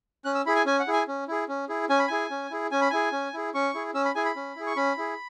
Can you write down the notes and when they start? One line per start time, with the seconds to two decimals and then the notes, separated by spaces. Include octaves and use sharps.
0.25 C#4 F#6
0.35 E6
0.46 E4 G#4 B5
0.56 G#5
0.66 C#4 G#5
0.80 F#5
0.87 E4 G#4
0.93 G#5
1.08 C#4
1.28 E4 G#4
1.48 C#4
1.69 E4 G#4
1.89 C#4 G#5
1.99 B5
2.08 E4 G#4 G#5
2.30 C#4
2.51 E4 G#4
2.71 C#4 G#5
2.81 B5
2.90 E4 G#4 G#5
3.12 C#4
3.34 E4 G#4
3.54 C#4 C#6
3.74 E4 G#4
3.94 C#4 E6
4.05 B5
4.15 E4 G#4 G#5
4.26 B5
4.36 C#4
4.56 E4 G#4
4.67 C#6
4.76 C#4 B5
4.97 E4 G#4